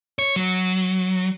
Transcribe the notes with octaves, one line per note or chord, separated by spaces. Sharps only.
C#5
F#3